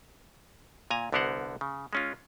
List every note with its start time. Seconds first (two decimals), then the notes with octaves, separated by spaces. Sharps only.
0.91 A#2 G#5 A#5
1.12 C2 D3 B3 A#4 C5 F#5
1.61 C#3
1.93 G#3 C#4 F4